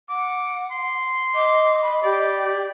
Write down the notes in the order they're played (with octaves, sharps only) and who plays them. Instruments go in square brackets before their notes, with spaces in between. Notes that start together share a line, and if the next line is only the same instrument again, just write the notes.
[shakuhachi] F#5 [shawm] D6
[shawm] C6
[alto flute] D#5 [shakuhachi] D6
[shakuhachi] B5
[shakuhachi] G4 [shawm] D5